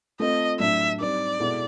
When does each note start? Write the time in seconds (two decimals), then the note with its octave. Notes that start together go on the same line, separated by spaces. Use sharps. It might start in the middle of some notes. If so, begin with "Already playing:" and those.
0.20 A3 C4 F4 A4 D#5
0.59 A2 F#3 A3 D4 E5
1.00 G3 C4 D#4 D5
1.40 B2 G#3 B3 E4 A4